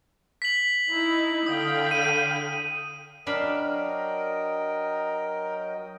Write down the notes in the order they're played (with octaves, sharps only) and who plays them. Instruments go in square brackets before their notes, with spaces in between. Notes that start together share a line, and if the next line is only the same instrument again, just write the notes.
[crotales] B6 F#7
[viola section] D#4 E4
[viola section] D3 F5 G5 [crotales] D#6
[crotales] D#7
[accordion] F#3 D#5 G5 [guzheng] D4 F5 B5 [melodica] A#4